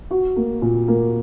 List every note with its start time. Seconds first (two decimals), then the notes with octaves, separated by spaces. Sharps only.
0.11 F#4
0.36 A#3
0.62 A#2
0.88 A#3